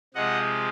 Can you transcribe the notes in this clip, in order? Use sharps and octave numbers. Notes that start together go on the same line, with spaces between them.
C3 F3 G#3 D#5 F#5